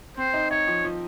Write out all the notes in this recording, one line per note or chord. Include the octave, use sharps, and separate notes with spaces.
C4 C5
D#4
D#4 C#5
F3
F3